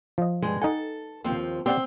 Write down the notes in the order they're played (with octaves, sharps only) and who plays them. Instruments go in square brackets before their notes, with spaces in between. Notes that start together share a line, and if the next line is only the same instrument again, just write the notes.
[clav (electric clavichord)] F3 D#5
[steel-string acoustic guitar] G2 G#3
[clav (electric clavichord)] D#4 F#5 G#5 [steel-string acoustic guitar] A4
[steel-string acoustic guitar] D#2 F3 C4
[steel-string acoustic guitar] C4 [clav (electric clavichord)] G4 D5 F#5